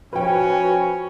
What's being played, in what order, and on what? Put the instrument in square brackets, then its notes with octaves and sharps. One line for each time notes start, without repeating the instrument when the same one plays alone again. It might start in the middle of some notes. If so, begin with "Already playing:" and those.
[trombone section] F3 [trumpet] C#4 [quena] F#4 [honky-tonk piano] B4 G5